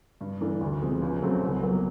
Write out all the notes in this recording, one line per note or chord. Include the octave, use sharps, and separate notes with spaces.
G2
E3 A3 D4
D2
C3 F3 G#3
C#2
C#3 F#3 A3 C4
C2
A#2 F#3 B3